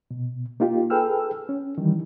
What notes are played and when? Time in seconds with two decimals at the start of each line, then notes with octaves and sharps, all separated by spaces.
0.11 B2
0.60 A#3 D#4 F4 G4
0.90 G#4 A4 B4 G5 E6 F6
1.49 C#4
1.78 D#3 E3 G3